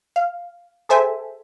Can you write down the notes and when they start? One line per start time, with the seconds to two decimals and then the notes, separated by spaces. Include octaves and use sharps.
0.16 F5
0.89 G#4 A4 C5 E5 G5 G#5